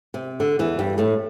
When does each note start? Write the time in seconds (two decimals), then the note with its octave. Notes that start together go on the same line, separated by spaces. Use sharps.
0.14 C3
0.40 D3
0.59 E2 E3
0.79 G2 G3
0.98 A2 A3